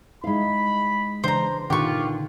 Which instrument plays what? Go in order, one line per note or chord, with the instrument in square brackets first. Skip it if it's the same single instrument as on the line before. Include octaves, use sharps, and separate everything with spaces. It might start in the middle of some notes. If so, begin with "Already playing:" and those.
[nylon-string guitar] G#3 F5 [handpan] D#4 E4 [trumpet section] B5
[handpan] C#3 E3 D4 [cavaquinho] C5 A#5
[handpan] A#2 D#3 F#5 [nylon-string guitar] D3 [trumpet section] F4 [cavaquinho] G4 C#6